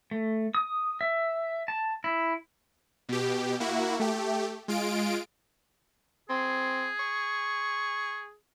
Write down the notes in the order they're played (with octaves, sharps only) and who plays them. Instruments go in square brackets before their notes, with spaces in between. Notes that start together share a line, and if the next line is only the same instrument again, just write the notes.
[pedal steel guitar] A3
D#6
E5
A5
E4
[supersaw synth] B2 G4
A#3 E4 F#4
A3 G4
G#3 F4 D7
[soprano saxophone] C4 [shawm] G#4
[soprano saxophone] C#6